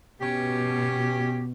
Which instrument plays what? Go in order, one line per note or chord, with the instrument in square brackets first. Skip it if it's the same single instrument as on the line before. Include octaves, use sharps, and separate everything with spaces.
[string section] B2 [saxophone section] C#4 G4